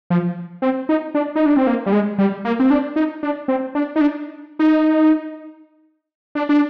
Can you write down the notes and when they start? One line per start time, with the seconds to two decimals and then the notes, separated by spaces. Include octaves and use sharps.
0.10 F3
0.62 C4
0.89 D#4
1.15 D4
1.36 D#4
1.46 D4
1.57 C4
1.67 A#3
1.86 G3
1.92 G#3
2.18 G3
2.45 A#3
2.60 C4
2.70 D4
2.96 D#4
3.23 D4
3.48 C4
3.75 D4
3.96 D#4
4.01 D4
4.59 D#4
6.35 D4
6.49 D4